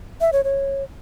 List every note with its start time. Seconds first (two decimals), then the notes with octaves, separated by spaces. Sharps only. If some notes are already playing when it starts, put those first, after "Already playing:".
0.21 E5
0.33 C#5
0.44 C#5